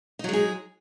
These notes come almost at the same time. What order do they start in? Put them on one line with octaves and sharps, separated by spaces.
D#4 F#3 G#3 G#4